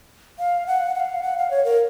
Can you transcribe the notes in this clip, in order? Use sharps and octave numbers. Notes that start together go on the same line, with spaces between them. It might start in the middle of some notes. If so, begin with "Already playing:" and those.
F5
F#5
F#5
F5
F#5
F5
C#5
A#4